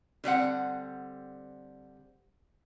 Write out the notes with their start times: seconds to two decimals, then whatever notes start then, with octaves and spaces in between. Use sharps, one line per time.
0.24 D3 G3 C4 F#5